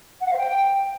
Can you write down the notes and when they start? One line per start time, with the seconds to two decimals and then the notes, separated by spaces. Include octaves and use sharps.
0.20 F#5
0.26 F5
0.32 C5
0.38 G5